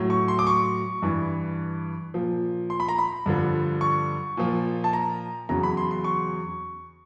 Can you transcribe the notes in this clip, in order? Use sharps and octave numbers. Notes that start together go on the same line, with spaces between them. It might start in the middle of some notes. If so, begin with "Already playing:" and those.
Already playing: A2 F#3
C#6
C6
D6
C#6
G2 E3
A#2 F3
C6
B5
A#5
B5
G2 D3 F3
C#6
A#2 F3
A5
A#5
E2 C#3 F#3 A#5
B5
C6
C6
C#6